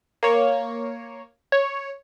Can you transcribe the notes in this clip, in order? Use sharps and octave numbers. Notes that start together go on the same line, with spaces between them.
A#3 C#5
C#5